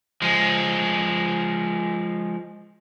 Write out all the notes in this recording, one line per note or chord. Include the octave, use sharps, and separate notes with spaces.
F3 G#3